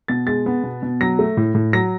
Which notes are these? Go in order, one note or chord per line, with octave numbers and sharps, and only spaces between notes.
B2 A6
G#3 A6
B3
B2
B2
F#3 A#6
A3
A2
A2
F#3 A#6